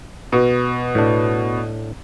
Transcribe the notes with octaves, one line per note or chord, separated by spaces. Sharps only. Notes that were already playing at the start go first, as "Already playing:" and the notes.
B2
A2 D4